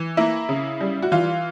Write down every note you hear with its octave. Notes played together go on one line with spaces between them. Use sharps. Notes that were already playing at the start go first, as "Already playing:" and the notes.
Already playing: E3
A#3 E4
C#3
G3
F#4
E3 F4